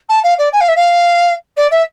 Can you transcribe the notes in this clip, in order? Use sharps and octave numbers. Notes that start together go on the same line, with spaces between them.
A5
F5
D5
G#5
F5
E5
F5
D5
E5